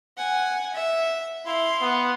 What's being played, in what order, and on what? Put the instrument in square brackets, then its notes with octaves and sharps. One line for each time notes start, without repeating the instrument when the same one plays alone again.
[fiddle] F#5 G#5
E5
[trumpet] E4 [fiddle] F5 C6
[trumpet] B3